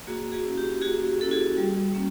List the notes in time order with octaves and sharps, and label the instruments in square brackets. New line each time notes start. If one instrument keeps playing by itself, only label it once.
[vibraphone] A#3 F#4 G#4
F#4 G#4
C#4 E4
G4
A#3 F#4 G#4
C#4 E4 A4
F#4 G#4
G3
A#3 C#4